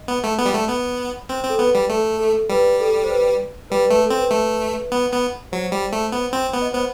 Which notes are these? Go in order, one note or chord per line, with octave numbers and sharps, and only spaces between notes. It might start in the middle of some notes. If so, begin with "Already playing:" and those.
Already playing: D#5
B3
A3
B3
G3
A3
B3
C4 C5
C4
A4
B3 B4
G3
A3 A4
A4
G3 B4
A4
C5
B4
G3 B4
A3 B4
A4
C4
B4
A3
B3
B3
F#3 C5
G3
A3
B3
C4
B3
D#5
B3 C5